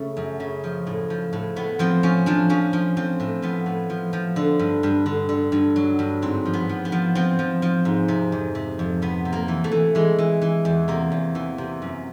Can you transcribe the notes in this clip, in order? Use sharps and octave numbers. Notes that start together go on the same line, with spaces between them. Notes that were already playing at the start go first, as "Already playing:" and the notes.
Already playing: C#3 A3
F#2
C#3
F3
A2
F3
A2
A2 B3
F3 C4
F3 C#4
F3 D4
F3 C#4
F3
F3 C4
A2
F3 B3
A2
F3
F3
D3
G2
G2
D3
D3
G2
F#3
G2
G#2 C4
F3
B3
F3
B3
F3
F3 C4
F3
F3
G#2
C3
F2
C3
F2
C3 B3
C3
A#3
E3
A3
E3
E3 G#3
E3
E3
E2
C3 A#3
E2
E3
C3
F#2